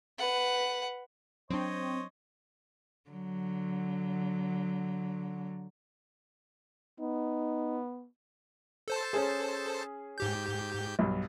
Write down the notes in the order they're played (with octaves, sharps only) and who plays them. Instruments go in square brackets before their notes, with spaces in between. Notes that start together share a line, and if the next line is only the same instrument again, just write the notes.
[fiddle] B4 F#5
[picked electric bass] F#3 D4 [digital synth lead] C4 [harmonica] C5 C#5 D#5
[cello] D3 F#3
[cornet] B3 [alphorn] D#4
[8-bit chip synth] A4 C5 A5
[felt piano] C#4 G#4
[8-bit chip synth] G#2 G4 G6
[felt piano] B1 G2